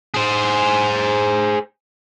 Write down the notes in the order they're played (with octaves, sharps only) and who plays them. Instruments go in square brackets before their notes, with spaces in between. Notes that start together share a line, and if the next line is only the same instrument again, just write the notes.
[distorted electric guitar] G#4 C5